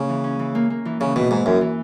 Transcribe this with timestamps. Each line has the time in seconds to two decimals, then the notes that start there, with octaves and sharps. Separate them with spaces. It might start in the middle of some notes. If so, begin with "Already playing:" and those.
Already playing: C#3 A#3
0.09 E3
0.24 C#4
0.39 E3
0.55 A#3
0.70 A#3
0.85 E3
1.00 C#3 E3
1.16 B2 E3
1.31 G#2 E3
1.46 F#2 E3
1.61 E3